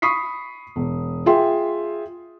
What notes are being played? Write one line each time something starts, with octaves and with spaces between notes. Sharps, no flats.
B5 C#6 D#6 B6 C7
E1
F4 G#4 E5 G5 C6